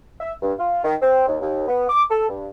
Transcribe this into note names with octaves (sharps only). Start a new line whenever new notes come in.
E5
G2
F4
D#3
C4
D#2
D#2
B3
D6
A4
G2